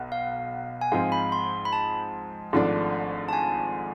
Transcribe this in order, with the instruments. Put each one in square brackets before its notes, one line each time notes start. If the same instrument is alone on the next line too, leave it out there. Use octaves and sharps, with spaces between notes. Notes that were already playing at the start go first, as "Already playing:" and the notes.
Already playing: [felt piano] B1 B2
[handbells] F5
G#5
[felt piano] G#2 F3 G#3 C4 [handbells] F5
[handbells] B5
C6
B5
A5
[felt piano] G#1 G#2 F3 A3 D4
[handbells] A5
G#5